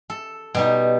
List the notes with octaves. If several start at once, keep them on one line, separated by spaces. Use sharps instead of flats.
A4
B2 G3 D#4